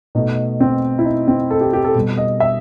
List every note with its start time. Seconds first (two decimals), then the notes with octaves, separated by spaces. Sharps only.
0.15 B2 A3 D#4
0.60 C4
0.99 E4
1.05 D#4
1.28 C4
1.51 A4
1.61 G4
1.73 G4
1.84 A4
1.95 B2 G3
2.18 D#5
2.40 E5